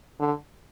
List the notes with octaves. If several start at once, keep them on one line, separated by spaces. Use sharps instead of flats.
D3